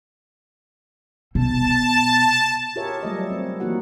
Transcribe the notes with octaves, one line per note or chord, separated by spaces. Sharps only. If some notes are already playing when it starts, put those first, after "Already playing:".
B2 A5
F4 G4 G#4 A#4 C#5 E5
F#3 G3 A3 A4 C#5 D#5
C4
E3 F3 A#3 D#4 F#4 F#5